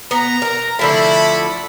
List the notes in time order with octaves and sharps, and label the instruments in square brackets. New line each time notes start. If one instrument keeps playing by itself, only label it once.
[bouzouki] B3 [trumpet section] A#5
[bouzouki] A#4
[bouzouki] D3 F3 A3 [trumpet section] E4 B5